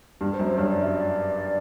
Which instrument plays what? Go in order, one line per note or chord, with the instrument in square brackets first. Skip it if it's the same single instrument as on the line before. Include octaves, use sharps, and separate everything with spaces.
[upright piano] G2 [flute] G4
[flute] C5
[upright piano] F#2
[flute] C5
[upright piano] G2 [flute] C#5
[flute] D5
E5
D5